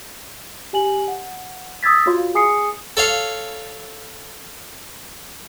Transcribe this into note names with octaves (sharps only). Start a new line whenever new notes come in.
G4 G#5 F#7
F#5
D#6 E6 G#6 A6 B6
F4 F#4 C#5 F5 C6
G#4 G#5 D#6 C7 C#7
A4 C#5 F5